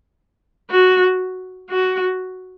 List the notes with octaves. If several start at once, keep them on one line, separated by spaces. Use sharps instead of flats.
F#4
F#4